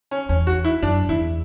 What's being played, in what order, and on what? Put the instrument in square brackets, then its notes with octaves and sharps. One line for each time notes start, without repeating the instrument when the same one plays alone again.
[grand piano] C#4
[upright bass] E2 [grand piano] C#4
[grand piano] F#4
E4
[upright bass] F#2 [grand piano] D4
[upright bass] E2 [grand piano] E4